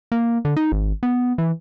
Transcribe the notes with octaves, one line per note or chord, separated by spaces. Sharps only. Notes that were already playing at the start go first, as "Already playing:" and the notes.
A#3
D3
D#4
G#1
B3
E3